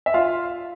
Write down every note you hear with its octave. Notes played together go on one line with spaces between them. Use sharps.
E5
F4 F5